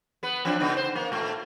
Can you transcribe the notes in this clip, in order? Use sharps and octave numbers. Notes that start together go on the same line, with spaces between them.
B3 B4
F3 C4 D4
C#3 B3 D#4
C5
A#3
A#2 A3